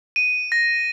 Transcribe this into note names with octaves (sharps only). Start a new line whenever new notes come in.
D#7
A#6